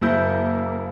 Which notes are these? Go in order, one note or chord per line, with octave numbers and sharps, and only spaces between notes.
F#1 A#3 E4 G6